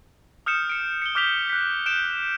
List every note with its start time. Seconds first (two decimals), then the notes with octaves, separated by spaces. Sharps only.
0.46 D#6 F6 G6 C#7 E7
0.70 C#7 D7
1.02 C#7 G7
1.15 D6 F6 G6 B6 F7 G7
1.50 F#6 B6
1.86 G6 D7 E7